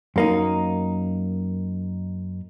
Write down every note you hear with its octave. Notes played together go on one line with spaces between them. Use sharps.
F#2 A#3 D#4